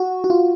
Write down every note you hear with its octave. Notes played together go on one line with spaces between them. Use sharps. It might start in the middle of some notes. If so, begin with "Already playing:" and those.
Already playing: F#4
F#4
F4